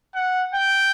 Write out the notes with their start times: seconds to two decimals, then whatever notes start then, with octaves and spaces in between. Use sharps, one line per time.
0.15 F#5
0.54 G5